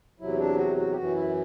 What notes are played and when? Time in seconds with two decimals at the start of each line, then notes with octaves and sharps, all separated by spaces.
0.20 E2 C3 F#3 E4
0.38 D4
0.58 F#4
0.77 F#4
0.91 G4
0.95 F#2 E3 F#4
1.15 E4